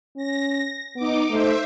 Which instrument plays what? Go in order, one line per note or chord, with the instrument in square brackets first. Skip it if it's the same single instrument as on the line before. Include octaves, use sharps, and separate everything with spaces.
[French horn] C#4 [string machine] A#6
[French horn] B3 [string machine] D#4 D6
[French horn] A3 [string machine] C5 E5